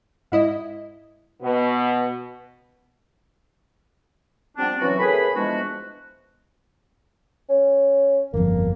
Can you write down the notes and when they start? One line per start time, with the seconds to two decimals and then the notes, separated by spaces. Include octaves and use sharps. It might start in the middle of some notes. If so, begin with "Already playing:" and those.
0.32 G#2 E4 D#5
1.41 B2 B3
4.58 F3 G3 B3 C4 D4
4.80 C3 E3 F#3 C4 C#4 F#4
4.99 F#2 A2 G#4 B4 G#5 B5
5.35 E3 F3 G#3 B3 D4 F#4
7.49 C#4
8.33 G1 F2 A#3